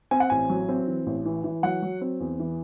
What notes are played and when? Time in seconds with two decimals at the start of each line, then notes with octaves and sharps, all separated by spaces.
0.11 C4 G#5
0.20 F#5
0.30 A1 G#5
0.49 F#3
0.69 C4
0.87 E3
1.06 A1
1.25 E3
1.44 E3
1.63 F#3 F#5
1.82 F#3
2.01 C4
2.20 E2
2.39 E3